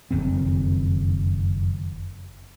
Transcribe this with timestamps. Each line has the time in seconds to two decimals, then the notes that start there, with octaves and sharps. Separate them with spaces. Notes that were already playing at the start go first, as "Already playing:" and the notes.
0.11 F#1 F2 D#3 C4